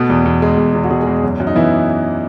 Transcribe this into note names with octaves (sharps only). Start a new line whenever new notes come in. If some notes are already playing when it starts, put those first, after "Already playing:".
Already playing: B2 A3 B3
E2
E2
G#3
E2
E2
F#4
B2 G#3 G#4
G#3 G#4
E2
F#2
F#2
D#4
E3 B3 E4